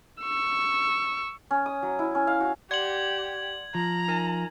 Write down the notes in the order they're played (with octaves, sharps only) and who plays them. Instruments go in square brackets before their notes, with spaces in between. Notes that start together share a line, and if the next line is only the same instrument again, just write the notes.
[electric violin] C#6 E6
[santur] C#4
D#6
F#3
E4
C#4
F5
F#4
[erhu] G4 [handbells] D5 F#5 C6 [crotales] G#6 F#7
[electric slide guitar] F3 [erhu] A#5
[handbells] D#4 A#4 G#5